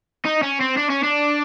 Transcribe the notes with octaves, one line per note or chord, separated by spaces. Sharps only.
D#4
C#4
C4
D4
C#4
D4